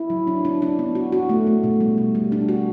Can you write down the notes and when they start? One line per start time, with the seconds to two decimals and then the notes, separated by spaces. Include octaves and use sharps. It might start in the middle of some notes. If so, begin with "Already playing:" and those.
Already playing: E4
0.10 F#3
0.27 D4
0.45 D4
0.62 D4
0.79 B3
0.95 F#4
1.12 F#4
1.29 A3
1.47 A3
1.64 B2
1.80 G3
1.98 G3
2.15 G3
2.32 D4
2.49 F#4